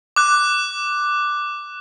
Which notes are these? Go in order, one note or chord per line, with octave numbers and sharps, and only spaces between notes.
D6 F#6